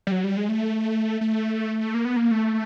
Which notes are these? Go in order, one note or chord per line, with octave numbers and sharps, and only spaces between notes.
G3
F#3
G3
G#3
A3
A3
A#3
B3
A#3
A3